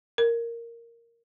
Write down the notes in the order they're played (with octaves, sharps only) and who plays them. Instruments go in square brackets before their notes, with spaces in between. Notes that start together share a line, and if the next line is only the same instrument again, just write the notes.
[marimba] A#4